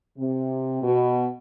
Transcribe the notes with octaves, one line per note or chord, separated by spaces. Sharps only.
C3
B2